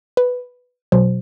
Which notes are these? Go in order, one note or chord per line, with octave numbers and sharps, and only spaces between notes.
B4
B2 F#3 C5